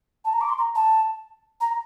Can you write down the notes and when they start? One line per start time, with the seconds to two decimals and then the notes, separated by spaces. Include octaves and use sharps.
0.25 A5
0.33 A#5
0.41 D6
0.49 C6
0.58 A#5
0.75 A5
1.61 A#5